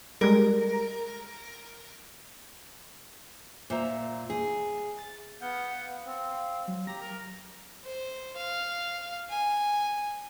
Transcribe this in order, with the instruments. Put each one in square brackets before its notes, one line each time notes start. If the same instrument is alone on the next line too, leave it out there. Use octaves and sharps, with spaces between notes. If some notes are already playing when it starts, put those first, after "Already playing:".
[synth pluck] G3 G#3 [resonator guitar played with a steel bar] A#4
[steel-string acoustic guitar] A#2 [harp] C5 E5 A#5
[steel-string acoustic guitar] G#4
[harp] A6
[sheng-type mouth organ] B3 F#5 G6 [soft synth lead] F5
[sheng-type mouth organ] C4
[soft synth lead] F#3
[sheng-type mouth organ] G4 A#5 [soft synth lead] A#6
[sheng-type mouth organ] A#4 A#5
[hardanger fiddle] C5
F5
G#5